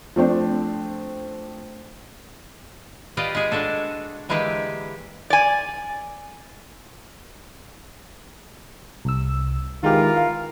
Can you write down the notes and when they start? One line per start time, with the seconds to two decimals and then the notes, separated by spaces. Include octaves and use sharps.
0.16 F3 A3 C4 D4
3.17 F4 G4 B4 D5 D#5
3.35 G#3 G#4
3.52 G#3 D4 F#4 A4
4.29 D3 E3 G#3 A#3 G4 B4
5.30 D5 G#5
9.05 C2 E6
9.83 D#3 E3 G#3 F4 G4 A#4
10.17 F5